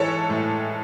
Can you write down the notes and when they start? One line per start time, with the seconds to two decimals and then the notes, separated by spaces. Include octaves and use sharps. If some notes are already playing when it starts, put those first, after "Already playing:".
Already playing: G#2 E3 A4 C#5
0.30 A2